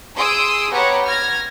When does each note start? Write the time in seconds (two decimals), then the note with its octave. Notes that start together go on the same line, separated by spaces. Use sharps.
0.15 G#4 C6 D#6 E6 D7
0.72 B3 G4 C#5 F#5 A#5
1.04 F6 G#6 A#6